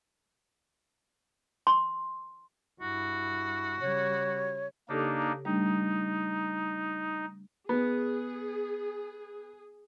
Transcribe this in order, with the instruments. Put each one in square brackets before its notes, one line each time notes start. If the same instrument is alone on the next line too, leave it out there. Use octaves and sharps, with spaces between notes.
[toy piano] C6
[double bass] G2 E4 [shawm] F#4
[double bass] C#3 G3 [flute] C#5
[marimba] C#3 G4 A4 [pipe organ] A#3 D4 D#4
[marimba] G3 A3 D4 [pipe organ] D#4
[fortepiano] B3 [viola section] G#4